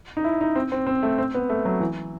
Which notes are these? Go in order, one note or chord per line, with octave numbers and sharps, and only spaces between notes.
D#4
E4
D#4
C4
C4
C4
A3
C4
B3
A3
F#3
E3